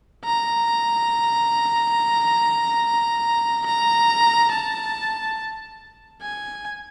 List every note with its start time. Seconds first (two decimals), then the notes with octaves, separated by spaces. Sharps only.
0.25 A#5
3.66 A#5
4.51 A5
6.22 G#5